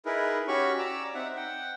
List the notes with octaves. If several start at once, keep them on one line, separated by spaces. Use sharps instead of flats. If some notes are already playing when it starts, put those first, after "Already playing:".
D#4 E4 G#4 A#4 B4
C#4 F#4 G4 C#5 B5 C#6
D5 A#5 D6 E6
C4 D#4 E5 F#5
F#5 G5